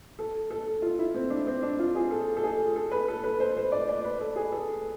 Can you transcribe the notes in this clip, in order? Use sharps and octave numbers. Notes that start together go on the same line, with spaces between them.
A4
A4
F4
E4
C4
D4
C4
D4
F4
G#4
A4
A4
G#4
A4
B4
A4
B4
C5
C5
D5
D5
B4
A4
G#4
A4